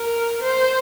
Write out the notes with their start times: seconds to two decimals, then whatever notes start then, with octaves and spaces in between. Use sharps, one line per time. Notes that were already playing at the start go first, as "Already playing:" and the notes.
Already playing: A#4
0.43 C5